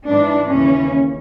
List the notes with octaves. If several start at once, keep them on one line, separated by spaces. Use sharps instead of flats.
G#2 E3 D4
D#2 C#3 E3 C#4